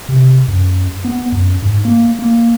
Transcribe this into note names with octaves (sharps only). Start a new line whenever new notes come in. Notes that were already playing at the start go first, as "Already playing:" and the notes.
C3
F#2
B3
F#2
G#2
A#3
A#3